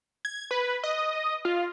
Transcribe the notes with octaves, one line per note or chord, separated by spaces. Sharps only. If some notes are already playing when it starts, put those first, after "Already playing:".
G#6
B4
D#5
F4